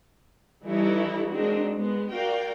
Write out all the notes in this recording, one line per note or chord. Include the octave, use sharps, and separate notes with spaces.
E3 G3 D#4 E4 A4 C#5
G#3 A#3 C4 D4 D#4 F#4
G#3 B3
F#4 A#4 D5 F5 G5